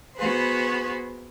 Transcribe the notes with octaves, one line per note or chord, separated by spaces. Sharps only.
B3 F#4 G#4 B4 C5